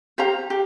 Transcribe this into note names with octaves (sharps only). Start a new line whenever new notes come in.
G4 C5 F5 A#5
G4